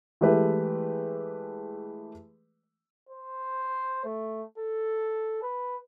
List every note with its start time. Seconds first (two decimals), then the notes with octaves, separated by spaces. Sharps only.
0.21 E3 G#3 A3 G4 B4
3.09 C5
4.05 A3
4.58 A4
5.42 B4